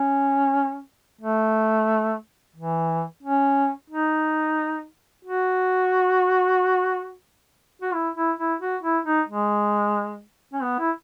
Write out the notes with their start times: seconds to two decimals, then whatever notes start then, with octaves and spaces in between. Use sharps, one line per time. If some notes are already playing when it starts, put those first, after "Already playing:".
Already playing: C#4
1.21 A3
2.56 E3
3.23 C#4
3.90 D#4
5.25 F#4
7.82 F#4
7.94 E4
8.16 E4
8.39 E4
8.60 F#4
8.83 E4
9.06 D#4
9.28 G#3
10.53 C#4
10.62 B3
10.79 E4